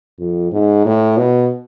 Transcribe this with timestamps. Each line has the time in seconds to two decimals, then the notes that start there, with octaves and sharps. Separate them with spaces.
0.19 F2
0.52 G#2
0.85 A2
1.17 B2